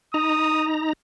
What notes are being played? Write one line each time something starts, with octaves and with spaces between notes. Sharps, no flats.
D#4 A#5 D#6